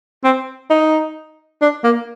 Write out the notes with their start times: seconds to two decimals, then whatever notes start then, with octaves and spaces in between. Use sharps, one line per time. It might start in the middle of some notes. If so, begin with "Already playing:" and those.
0.24 C4
0.70 D#4
1.61 D4
1.84 A#3